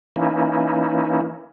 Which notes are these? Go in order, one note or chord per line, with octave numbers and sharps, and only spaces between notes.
E3 A#3 C#4 D#4 E4